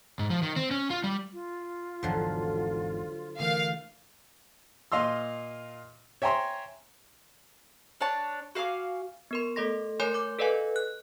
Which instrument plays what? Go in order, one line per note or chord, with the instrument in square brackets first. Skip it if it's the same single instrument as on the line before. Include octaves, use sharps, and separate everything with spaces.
[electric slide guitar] G#2
F3
D#3
C4
C#4
F4
G3
[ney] F4
[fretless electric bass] G#1 E2 [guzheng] D3 F3 F#3
[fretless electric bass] D3 E3 A3 [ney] A#4 [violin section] F5
[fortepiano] A#2 D#5 F5 C6 E6
C#5 E5 G5 G#5 A#5 C6
[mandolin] D4 C#5 A5
F#4 F5 G#5 D6
[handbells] B3 A#4 C6
A3 A4 D#5 C6 A#6
A3 A#4 C#5 G#5 C6 G6
D6 G6
A4 B4 D5 D#5 F5 G#5
F#6